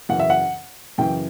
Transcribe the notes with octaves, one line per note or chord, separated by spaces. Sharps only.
F#2 C#3 E3 F#5
E5
F#5
F#2 C#3 E3 G5